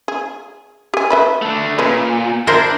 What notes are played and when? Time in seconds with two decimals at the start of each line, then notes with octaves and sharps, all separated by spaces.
0.08 G#4
0.94 G4 G#5
1.10 B4 E5 B5
1.42 A3 D4
1.79 A#2 C#3 C#4 B4
2.47 D4 E4 A#4 C5